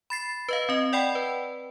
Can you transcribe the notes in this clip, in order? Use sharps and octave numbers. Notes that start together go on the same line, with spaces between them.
B5 A6 C7
B4 D#5 F5
C4 D#5
D5 F#5 G5 B5
B4